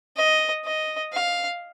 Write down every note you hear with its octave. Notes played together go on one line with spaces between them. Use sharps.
D#5
D#5
F5